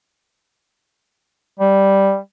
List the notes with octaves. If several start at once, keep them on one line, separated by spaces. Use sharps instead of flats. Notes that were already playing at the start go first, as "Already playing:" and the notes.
G3